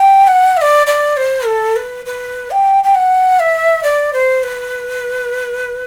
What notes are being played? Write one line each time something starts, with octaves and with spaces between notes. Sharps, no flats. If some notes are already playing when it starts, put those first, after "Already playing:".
Already playing: G5
F#5
E5
D5
D5
C5
A4
B4
B4
G5
G5
F#5
E5
D5
C5
B4